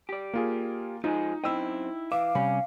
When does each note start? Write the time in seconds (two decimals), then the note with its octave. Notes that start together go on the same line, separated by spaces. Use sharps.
0.09 G4 D5
0.34 A#3 F4 G#4
1.04 F3 G#3 D#4 F4 G#4
1.44 F#2 C4 D#4 E4 D#5 G5 E6
2.12 E3 E5 F5 D6
2.35 C3 G3 C#4 B5